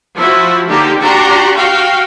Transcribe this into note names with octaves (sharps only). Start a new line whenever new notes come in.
F3 E4 F#4
D3 A#3 D#4 G4
D4 F#4 G4 A#5 C6
F#4 F5 G5